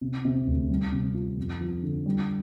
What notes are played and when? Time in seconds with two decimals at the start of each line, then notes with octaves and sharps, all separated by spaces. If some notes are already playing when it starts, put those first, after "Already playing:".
0.01 C3
0.25 C3
0.47 D2
0.70 G3
0.92 C3
1.14 F4
1.37 F2
1.61 F3
1.83 D3
2.06 G3